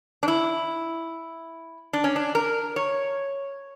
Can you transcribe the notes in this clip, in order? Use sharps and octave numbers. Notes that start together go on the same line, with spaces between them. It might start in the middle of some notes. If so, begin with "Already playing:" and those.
D4
E4
D4
C#4
D4
A#4
C#5